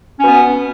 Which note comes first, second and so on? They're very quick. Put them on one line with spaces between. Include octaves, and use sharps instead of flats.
C#4 B2 B3